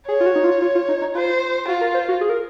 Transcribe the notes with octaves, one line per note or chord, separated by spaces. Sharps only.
G#4 C#5
F4
F#4
D#4
F4
F4
F4
D#4
D#4
F4 C5
F4 F#4
A#4
C5
F#4
G#4
A#4